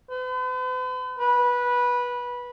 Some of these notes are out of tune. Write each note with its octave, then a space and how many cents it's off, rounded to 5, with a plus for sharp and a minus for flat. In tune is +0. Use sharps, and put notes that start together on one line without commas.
B4 +45
B4 -15